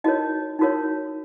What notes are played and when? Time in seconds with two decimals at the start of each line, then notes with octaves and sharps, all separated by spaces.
0.04 D#4 F#4 A#4 C#5 D#5
0.59 D#4 F#4 A#4 C#5